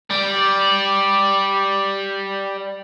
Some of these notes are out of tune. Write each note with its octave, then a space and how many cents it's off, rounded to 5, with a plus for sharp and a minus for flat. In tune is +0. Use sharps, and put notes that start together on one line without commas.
G3 +0 D5 +0